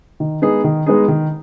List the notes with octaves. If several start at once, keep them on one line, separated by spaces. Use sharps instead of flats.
D#3
G#3 B3 D#4 G#4
D#3
G#3 B3 D#4 G#4
D#3